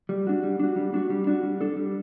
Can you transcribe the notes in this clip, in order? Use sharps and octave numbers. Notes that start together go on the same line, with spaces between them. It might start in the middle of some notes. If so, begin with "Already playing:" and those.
G3
D4 F#4
G3
D4 F#4
G3
D4 F#4
G3
D4 F#4
G3
D4 A4
G3